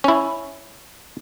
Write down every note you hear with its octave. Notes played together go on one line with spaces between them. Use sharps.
C#4 E4